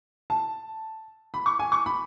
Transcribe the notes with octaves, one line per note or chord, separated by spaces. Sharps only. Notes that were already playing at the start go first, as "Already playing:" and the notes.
A5
B5
C#6
G#5
C#6
B5